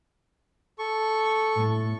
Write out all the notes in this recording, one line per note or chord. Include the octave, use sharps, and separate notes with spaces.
A4 C#6
A2